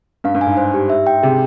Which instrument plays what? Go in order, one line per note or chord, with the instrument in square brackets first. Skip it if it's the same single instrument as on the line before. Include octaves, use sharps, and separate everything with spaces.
[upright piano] G2 [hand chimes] F5
[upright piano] G2
[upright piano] G#2 [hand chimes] G#5
[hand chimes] C5
G4
E5
G5
[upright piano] C3 [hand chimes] G#4